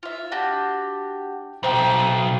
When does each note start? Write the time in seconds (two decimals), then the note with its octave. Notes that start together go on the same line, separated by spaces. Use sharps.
0.03 F4 E5
0.32 D4 F#4 G4
1.63 B1 C5 E5 G5